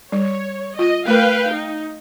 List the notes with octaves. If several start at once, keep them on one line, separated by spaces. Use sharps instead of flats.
G3 C#5
F4 D#5
A3 A#4 B4 F5 G5
D#4